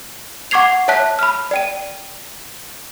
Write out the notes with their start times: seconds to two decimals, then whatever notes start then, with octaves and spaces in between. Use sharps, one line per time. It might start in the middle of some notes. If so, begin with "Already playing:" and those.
0.51 F#5 C#6 D6 G#6 C7 F7
0.88 C#5 E5 A5 F#6 B6
1.19 B5 F6
1.51 D5 G5 D#7